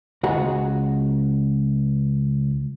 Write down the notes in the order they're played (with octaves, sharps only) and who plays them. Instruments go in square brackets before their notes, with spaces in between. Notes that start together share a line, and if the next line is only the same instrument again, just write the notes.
[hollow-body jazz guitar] C#2 F#4 G#4 A#5